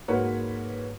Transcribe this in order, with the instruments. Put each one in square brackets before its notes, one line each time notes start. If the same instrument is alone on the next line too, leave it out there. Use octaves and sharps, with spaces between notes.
[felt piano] G#2 A#3 F#4 B4 C#5